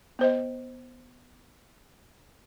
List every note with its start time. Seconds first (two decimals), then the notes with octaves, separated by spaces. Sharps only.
0.19 B3 C5 D#5